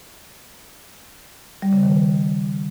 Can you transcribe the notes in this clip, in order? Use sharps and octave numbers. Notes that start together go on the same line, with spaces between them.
G3
C#3
D#3